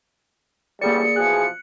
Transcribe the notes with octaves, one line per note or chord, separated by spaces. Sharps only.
A1 D2 G3 A#3 G#4 D5 C#7
B2 E3 F3 G#4 F#6